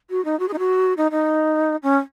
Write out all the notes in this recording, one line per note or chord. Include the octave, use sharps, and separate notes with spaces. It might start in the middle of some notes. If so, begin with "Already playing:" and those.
F#4
D#4
F#4
G#4
D#4
F#4
D#4
D#4
C#4